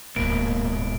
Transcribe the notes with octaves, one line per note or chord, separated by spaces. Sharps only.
D1 D2 G#2 B2 A#3 D7